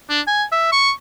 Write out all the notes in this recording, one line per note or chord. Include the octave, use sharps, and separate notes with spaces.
D4
G#5
E5
C#6